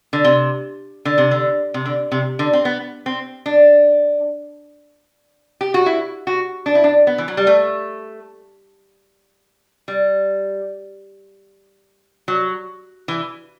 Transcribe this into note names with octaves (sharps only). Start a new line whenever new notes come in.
D3
C3
D3
C3
D3
C3
D3
C3
D3
C4
B3
C4
D4
G4
F#4
E4
F#4
D4
E4
D4
B3
E3
F#3
G3
A3
G3
F#3
E3